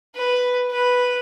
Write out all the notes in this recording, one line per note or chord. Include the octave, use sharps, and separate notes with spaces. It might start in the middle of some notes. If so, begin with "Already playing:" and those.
B4
B4